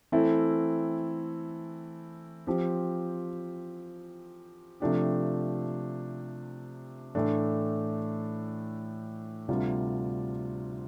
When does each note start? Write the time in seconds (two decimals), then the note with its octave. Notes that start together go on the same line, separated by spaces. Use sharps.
0.12 E3 A3 C4 E4 A4
2.47 F3 C4 G4 C5
4.80 C3 F3 A3 D4 G4
7.15 A2 E3 A3 D4
9.48 D2 C3 G3 D4 F4